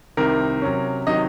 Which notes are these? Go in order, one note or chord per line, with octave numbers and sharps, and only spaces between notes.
C2 C3 D#3 A#4
C3 F#3 C#4
C3 D#3 F#3 D#5